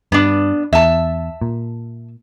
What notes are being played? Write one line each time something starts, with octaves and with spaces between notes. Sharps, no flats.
G2 B3 D4
E2 E5 A5
A#2